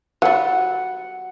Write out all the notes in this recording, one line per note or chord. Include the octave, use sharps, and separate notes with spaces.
F#3 G3 F#5